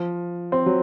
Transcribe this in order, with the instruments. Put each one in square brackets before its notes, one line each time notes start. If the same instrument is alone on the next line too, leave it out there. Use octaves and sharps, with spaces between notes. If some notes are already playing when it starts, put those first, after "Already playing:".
Already playing: [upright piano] F3
C4
F#3